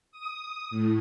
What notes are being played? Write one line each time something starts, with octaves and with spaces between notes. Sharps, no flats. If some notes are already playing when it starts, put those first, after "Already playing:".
D#6
A2